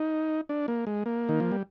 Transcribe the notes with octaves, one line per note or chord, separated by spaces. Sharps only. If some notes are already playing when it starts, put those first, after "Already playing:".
Already playing: D#4
D4
A#3
G#3
A#3
D#3
F3
G3